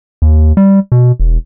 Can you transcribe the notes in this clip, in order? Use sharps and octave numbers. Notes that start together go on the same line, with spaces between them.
D#2
G3
B2
E1